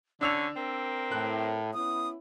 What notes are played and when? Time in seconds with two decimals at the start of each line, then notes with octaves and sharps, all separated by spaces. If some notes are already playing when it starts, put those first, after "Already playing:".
0.21 D3 C#4 D4 E6 F7
0.56 C4 A#4
1.11 A2 F#6
1.74 B3 C#4 E4 D#6